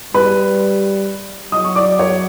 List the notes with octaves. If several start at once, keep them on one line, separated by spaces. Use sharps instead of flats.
G3 B4 B5
F#3 D#5 D#6
C#6
D5 D6
C#5 C#6